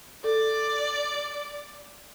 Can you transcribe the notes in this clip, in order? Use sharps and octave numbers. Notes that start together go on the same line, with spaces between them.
A4 D5